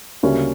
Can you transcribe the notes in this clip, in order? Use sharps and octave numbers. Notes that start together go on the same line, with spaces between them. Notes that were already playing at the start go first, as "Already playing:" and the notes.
D2 C#3 G3 A#3 C#4